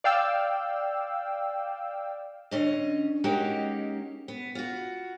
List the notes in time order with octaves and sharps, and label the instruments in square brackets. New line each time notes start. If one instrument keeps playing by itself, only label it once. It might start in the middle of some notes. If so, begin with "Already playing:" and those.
[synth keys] D5 F5 G5 E6
[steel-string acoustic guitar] D3 C#4 D#5
G#3 A#3 C#4 D#4 F#4 G4
B3
F4 F#4